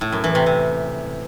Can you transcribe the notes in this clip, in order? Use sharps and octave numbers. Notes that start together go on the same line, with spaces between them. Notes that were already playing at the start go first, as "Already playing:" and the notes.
A2
F#2
E3
C3
C3